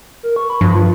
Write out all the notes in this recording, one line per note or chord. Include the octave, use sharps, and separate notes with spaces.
A#4
C#6
B5
G2 F3
F4